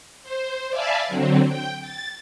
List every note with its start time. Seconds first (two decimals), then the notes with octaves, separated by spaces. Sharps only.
0.23 C5
0.70 D5 E5 F5 G#5 A5 B5
1.08 D3 F#3 C4
1.46 G5
1.82 A6